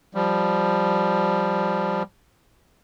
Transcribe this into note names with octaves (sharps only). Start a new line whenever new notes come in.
F3 G3